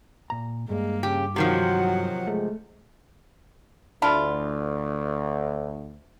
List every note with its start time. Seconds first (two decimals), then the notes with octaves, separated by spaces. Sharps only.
0.30 A#2 A#5
0.69 G2 G#3 A#3
1.03 C#3 G4
1.36 C3 D#3 F3 F#3 F#4 F#5
2.27 G#3 A3
4.02 D2 D4 E4 F4